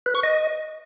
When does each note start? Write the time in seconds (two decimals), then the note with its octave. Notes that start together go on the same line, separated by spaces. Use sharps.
0.06 B4
0.15 C#6
0.23 D#5